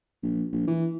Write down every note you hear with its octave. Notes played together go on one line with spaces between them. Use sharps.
A#1
A#1
E3